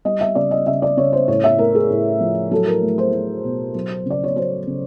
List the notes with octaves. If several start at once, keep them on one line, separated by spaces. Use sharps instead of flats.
G3 D#5
E5
C#3 D5
D#5
C#3 E5
D5
C#3 C#5
C5
A2 C#5
E5
A3 A#4
G#4
A2
F3
F#3 A4
A#4
A3
C5
A3
B2
F#3
C#3 D5
C#5
F#3 C5
C#3